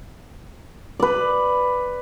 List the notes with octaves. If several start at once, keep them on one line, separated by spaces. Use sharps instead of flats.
B4 D5